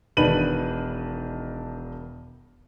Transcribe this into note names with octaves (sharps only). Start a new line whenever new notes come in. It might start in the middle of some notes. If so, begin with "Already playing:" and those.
E1 D#3 D4 B4 D#7 F#7